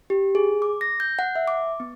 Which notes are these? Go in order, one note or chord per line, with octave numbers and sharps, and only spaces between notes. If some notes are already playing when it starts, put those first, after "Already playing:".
G4
G#4
D6
A#6
G6
F#5
E5
D6
B3